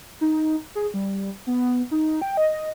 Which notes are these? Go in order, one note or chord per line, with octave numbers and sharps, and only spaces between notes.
D#4
G#4
G3
B3
D#4
G5
D#5